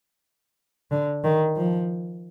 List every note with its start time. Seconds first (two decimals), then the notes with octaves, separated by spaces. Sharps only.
0.91 D3
1.24 D#3
1.57 F3